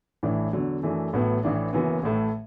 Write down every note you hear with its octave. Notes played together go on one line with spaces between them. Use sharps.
A1 A2 E3 D4
E2 D3 F#3
F#2 E3 A3 D4
A1 A2 F#3 B3
A1 A2 E3 D4
F#1 F#2 E3 B3
A1 A2 A3